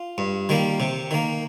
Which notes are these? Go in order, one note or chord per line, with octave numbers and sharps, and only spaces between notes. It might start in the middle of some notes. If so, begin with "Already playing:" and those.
Already playing: F4
G2
D#3 G3 A#3
C3
D#3 A#3